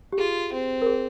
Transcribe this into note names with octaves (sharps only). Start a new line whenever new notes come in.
G4
F4 G#4
C4
A#4
G#4